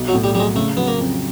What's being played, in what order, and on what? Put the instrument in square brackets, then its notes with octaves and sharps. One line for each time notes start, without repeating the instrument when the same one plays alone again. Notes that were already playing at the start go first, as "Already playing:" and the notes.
Already playing: [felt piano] B1
[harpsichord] F#3
[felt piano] A2
[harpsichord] G3
[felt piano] F#3 [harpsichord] G3
[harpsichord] G#3
[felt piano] C#3 [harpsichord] A3
[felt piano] F#3 [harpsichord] B3
[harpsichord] A#3
[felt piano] F2